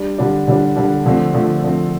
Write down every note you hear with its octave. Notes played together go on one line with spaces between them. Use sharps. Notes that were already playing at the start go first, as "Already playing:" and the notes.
Already playing: G3 D4
D3 G3 D4
D3 G3 D4
D3 G3 D4
D3 F3 A3 C4
D3 F3 A3 C4
D3 F3 A3 C4